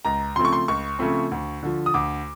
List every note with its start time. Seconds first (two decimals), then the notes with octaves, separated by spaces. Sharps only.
0.05 C#2 A#5
0.36 C#3 F3 A3 C4 C6
0.45 C#6
0.53 C6
0.68 C#2 C#6
0.99 C#3 F3 A3 C4
1.31 D2
1.63 D3 F3
1.86 D#6
1.94 D2 D6